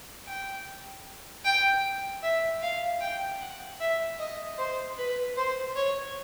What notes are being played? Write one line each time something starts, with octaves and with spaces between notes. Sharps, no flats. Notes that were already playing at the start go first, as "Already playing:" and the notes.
G5
G5
E5
F5
G5
F#5
E5
D#5
C5
B4
C5
C#5